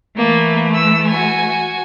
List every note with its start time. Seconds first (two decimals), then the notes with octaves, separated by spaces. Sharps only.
0.17 E3 A3 A#3
0.74 E6
1.07 F#4 G#5